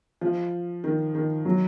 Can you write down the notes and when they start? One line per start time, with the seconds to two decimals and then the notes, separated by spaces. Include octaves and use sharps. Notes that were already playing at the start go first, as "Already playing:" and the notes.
0.21 F3
0.84 D#3
1.15 D#3
1.45 F#3